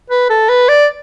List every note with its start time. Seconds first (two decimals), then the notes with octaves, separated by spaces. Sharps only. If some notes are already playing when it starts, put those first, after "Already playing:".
0.10 B4
0.30 A4
0.49 B4
0.69 D5